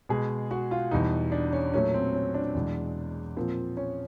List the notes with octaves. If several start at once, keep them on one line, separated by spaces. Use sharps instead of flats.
B2 G#3 G#4
F#4
F4
E2 B2 G3 D#4
D4
C#4
A#2 F#3 A3 C#4
C4
C#4
D4
E2 B2 G#3
A#2 F3 A#3 C4
C#4